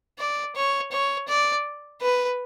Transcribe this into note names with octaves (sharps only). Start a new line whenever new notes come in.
D5
C#5
C#5
D5
B4